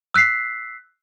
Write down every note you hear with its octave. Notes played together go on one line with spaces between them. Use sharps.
E6 F#6 B6 C7